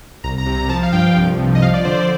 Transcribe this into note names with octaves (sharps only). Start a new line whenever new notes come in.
C2 A#5
A#5
C3
A#5
F3 A5
F5
G2 G5
C2
C3
D#5
F3 F5
D5
D3 C5
D5